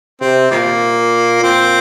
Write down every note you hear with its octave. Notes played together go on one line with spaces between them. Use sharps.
C3 C4
A#2 D#3 G3 A#3
A#2 C4